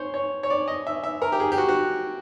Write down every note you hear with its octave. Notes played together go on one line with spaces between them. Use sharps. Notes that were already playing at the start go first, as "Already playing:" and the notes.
Already playing: C5 C#5
C#5
C#5
D5
D#5
E5
E5
A#4
G4
G#4
G4
F#4
F#4